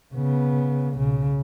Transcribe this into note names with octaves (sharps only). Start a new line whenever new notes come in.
C#3 B3
B1 C#3